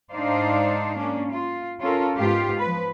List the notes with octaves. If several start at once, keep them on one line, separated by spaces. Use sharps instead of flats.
G#2 D4 D#4 C5 D5 F5
A#3 C#4 D4
F4
C#4 F4 A4 A#4
G#2 B3 F4 G4 F5
F3 B4